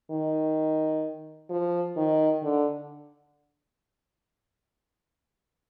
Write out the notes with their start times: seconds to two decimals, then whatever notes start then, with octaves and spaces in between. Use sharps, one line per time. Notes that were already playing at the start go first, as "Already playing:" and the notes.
0.11 D#3
1.50 F3
1.97 D#3
2.43 D3